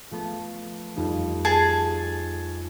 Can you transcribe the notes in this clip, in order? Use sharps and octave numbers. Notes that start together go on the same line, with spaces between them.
F3 A3 B3
F2 G3 D#4
G#4 A5